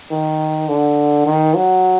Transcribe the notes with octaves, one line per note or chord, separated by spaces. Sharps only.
D#3
D3
D#3
F#3